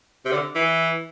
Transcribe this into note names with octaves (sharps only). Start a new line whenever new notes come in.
C3
D3
E3